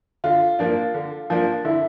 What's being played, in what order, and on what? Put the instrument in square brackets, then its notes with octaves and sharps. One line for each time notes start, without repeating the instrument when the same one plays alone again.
[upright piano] D3 F4
F3 A#3 D4
D3
F3 A#3 D4
D3 E4